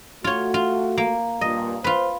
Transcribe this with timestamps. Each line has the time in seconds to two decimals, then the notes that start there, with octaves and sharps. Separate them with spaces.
0.24 A3 F4 F#4 C#5
0.54 F4
0.98 A#3
1.41 G2 A#2 D#5
1.84 F4 B4 C5